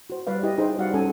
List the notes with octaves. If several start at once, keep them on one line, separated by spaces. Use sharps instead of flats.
F#4 C5
G3 B4 D5 F5
E4 G4 D5 D#5 F5
D#4 G#4 C5 D#5 G5
G3 F#4 D5 F5 F#5
G3 C#4 A4 G#5